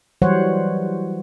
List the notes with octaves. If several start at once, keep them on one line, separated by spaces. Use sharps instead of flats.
E3 F#3 G3 C5 C#5 F#5